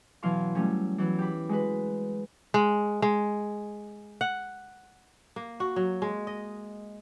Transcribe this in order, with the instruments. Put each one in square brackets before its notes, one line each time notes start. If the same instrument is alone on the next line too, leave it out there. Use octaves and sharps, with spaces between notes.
[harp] B2 E3 F#3 F5 C6 C#6
F#3 G3 A3 C#4
E3 F#3 B3
G4 B5
G#3 F#4 B4
[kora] G#3
G#3
F#5
A#3
F#4
F#3
G#3
D#5